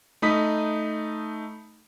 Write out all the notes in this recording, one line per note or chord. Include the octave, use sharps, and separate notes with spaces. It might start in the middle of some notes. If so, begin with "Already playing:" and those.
A3 D#4 B5 D#6 B6